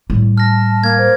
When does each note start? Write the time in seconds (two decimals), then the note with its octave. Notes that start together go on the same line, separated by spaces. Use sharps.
0.10 A2 G3
0.38 A5 F6 A#6
0.84 A#3 F6 G#6
0.98 C5